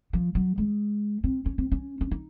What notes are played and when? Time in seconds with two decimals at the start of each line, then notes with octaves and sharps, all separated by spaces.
0.13 F3
0.35 F#3
0.58 G#3
1.24 C4
1.46 C#4
1.58 C4
1.72 C#4
2.01 C#4
2.11 D#4